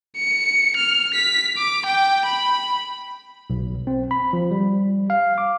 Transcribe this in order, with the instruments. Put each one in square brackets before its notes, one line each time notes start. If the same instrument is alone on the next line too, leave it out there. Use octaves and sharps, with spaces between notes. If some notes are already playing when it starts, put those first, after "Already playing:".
[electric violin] C#7
F6
B6
D6
G5
B5
[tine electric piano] B1
C4
B5
F3
G3
F5
D6